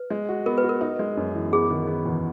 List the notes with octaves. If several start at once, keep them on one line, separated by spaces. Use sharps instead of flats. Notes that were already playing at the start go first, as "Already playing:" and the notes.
Already playing: B4
G#3
F#4
B3 A#4
B4
F#4
A#4
D#4
G#3
F#2
E3
B3 G#4
D#3
B3
E2